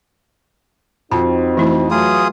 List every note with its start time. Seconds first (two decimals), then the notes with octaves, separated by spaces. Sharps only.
1.12 F2 C4 D#4 F#4 A5
1.57 E3 A3 E4
1.91 E3 F#3 A3 F4 G#4 D#6